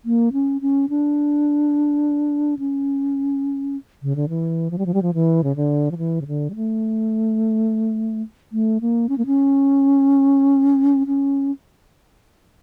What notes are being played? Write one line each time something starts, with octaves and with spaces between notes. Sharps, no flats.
A#3
C#4
C#4
D4
C#4
C#3
D3
E3
F3
G3
F3
G3
F3
E3
C#3
D3
F3
E3
C#3
D3
G3
A3
A3
A#3
C#4
A#3
C#4
C#4